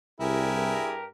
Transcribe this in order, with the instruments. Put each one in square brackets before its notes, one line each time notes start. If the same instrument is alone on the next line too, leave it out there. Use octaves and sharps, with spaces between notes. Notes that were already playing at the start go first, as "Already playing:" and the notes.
[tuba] C2 [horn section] G2 G4 A#4 [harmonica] E4 G#4